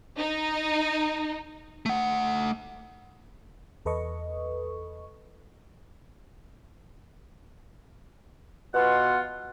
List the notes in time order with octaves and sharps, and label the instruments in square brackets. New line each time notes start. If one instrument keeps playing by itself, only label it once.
[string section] D#4
[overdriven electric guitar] A3 F#5
[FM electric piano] E2 A4 B4 D#5 C#6
[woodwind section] B2 F4 F#5